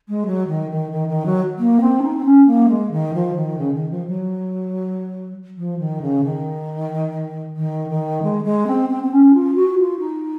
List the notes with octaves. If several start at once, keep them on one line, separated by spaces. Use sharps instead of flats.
G#3
F#3
D#3
D#3
D#3
D#3
F#3
A#3
C4
D#4
C4
C#4
A#3
G#3
D#3
F3
D#3
C#3
D#3
F3
F#3
F3
D#3
C#3
D#3
D#3
D#3
G#3
G#3
C4
C4
C4
C#4
F4
F#4
F4
D#4